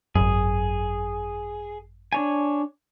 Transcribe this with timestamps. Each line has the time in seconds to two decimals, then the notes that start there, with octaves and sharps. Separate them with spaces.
0.15 G#1 F#2 G#4
2.13 D4 C#5 G#5